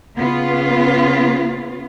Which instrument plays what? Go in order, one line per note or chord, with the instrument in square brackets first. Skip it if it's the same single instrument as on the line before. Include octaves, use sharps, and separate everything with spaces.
[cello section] C#3 B3 F4